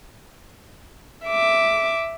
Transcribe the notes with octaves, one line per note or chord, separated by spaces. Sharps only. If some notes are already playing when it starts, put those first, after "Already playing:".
E5 D6